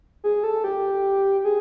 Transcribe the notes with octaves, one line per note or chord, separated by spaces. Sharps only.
G#4
A4
G4
G#4